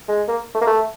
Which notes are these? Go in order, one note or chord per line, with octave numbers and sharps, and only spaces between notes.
G#3
A#3
A3
A#3
A3